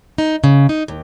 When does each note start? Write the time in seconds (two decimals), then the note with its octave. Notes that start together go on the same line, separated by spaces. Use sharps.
0.18 D#4
0.44 C#3
0.69 D#4
0.88 D#2